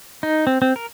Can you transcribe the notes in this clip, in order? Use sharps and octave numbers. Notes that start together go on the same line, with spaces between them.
D#4
C4
C4
A#4